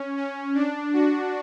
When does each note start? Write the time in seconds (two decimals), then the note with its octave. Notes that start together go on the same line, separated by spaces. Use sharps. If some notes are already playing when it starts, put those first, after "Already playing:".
Already playing: C#4
0.17 C#4
0.55 D4
0.93 F#4